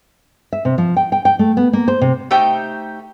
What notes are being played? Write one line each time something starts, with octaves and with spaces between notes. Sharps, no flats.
E5
C3
F3
G5
G5
G5
A3
B3
A#3
C5
C3
A3 D#4 G4 C5 G5